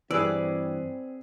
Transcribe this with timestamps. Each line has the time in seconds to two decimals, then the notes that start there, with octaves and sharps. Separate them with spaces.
0.11 G2 E3 C4 G#4 B4 D5 E6